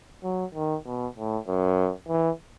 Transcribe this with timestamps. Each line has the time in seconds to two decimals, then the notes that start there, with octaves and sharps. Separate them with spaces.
0.23 F#3
0.54 D#3
0.86 B2
1.16 A2
1.47 F#2
2.08 E3